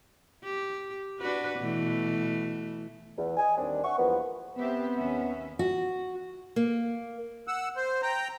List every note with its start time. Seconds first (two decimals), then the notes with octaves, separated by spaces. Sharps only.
0.44 G4
1.19 D4 F#4 B4
1.59 B2 E3 A3
3.18 E2
3.37 D#5 G#5
3.57 D#2 G3 C4 D4
3.83 E5 F#5 C#6
3.98 E2 G2 F3 A#3 B3
4.57 B3 C4 G4 E5
4.94 D#2 C#4 E5
5.59 F#4
6.56 A#3
7.48 F#5 E6
7.76 C5
8.02 G5 A#5